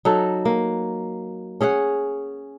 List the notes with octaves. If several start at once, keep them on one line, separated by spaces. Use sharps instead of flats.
F#3 D#4 A4
A#3
C#4 G#4 C#5 F#5